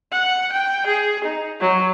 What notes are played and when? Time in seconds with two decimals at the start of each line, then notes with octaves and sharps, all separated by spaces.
0.12 F#5
0.52 G5
0.86 G#4
1.24 D#4
1.60 F#3